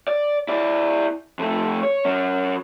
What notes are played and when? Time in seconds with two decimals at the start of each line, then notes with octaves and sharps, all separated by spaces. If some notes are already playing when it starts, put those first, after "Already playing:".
0.08 D5
0.49 E4 D5
1.39 F2 A3
1.83 C#5
2.05 F#3 C#4